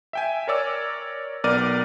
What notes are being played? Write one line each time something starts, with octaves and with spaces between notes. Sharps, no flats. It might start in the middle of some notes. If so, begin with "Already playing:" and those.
E5 G5 G#5
A#4 C#5 D5 E6
B1 B3 A#4 D5 F6 D#7